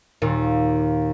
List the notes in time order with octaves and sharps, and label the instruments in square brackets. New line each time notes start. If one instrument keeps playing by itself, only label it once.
[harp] D#2 A#2